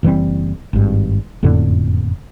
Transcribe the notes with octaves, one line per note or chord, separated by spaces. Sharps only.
F#1 E3 G3 C4
G#1 G2
F#1 F2 A2 D3